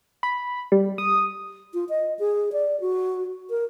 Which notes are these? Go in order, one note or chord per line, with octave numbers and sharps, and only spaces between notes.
B5
G3
D#6
F4
D#5
G#4
D5
F#4
A#4